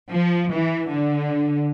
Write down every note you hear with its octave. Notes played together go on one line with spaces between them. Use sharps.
F3
E3
D3